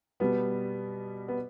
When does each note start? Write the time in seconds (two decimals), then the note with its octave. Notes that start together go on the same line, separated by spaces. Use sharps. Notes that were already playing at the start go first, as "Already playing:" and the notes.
0.20 B2 G3 B3
1.28 B3